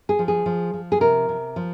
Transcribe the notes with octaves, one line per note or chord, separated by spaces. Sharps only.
G#4
F3
G#4
F3
F3
G#4
C3 A#4
C3
F3